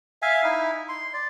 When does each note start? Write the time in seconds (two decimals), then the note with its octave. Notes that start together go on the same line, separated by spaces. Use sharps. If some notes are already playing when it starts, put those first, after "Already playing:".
0.22 E5 F5 G#5
0.44 D#4 E4
0.89 C6
1.14 D5